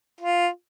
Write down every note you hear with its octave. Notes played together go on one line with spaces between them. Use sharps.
F4